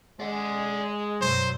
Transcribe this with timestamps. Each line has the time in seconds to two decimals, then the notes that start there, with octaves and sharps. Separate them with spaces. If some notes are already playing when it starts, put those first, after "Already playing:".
0.20 G#3 D5 F#5
1.21 F#2 B2 F#3 C5